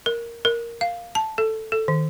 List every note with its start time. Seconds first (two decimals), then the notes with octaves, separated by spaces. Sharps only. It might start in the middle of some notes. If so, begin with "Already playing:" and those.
0.06 A#4
0.45 A#4
0.81 F5
1.15 A5
1.38 A4
1.72 A4
1.88 D#3